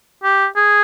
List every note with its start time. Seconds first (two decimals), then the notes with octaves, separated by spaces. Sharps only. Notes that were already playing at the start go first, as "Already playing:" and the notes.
0.23 G4
0.56 G#4